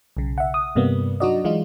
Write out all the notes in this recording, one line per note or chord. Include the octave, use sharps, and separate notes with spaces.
B1 C#3
E5 F#5
D#6
G2 C3 G3 A#3 B3
F#3 D4 D#4 F#4 D5 D#5
E3 G#3 D#4 F4